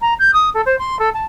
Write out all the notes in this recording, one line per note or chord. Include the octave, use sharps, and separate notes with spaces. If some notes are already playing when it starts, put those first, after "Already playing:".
A#5
G6
D#6
A4
C5
C6
A4
A5